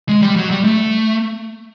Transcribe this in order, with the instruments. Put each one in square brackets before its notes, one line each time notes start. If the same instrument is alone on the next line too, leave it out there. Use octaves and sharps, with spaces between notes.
[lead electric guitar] G#3
G3
F#3
G3
A3